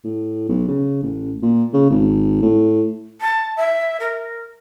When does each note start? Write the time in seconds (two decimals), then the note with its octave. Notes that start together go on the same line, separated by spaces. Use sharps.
0.04 A2
0.49 B1
0.68 C#3
1.03 A1
1.43 A#2
1.74 C#3
1.90 G#1
2.42 A2
3.21 A5
3.57 E5
4.00 A#4